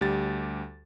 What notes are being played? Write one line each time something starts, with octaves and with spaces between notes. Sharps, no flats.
D2 G3 G4 A6